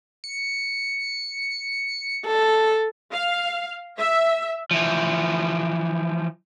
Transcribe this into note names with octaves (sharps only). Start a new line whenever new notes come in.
C#7
A4
F5
E5
E3 F3